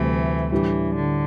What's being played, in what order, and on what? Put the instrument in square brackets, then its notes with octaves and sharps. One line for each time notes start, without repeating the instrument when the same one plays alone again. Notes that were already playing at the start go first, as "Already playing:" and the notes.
Already playing: [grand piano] D2 C3 G3 [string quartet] E3 A3
[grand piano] A2 G3 D4 G4 [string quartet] E3
[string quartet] D3